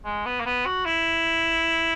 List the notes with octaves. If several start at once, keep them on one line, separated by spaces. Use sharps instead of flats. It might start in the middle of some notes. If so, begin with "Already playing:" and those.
G#3
B3
A#3
B3
F#4
E4